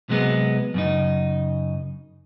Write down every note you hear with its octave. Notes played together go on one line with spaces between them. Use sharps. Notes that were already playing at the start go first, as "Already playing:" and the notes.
C3 F#3 G#3 B3
F#2 C#3 D#4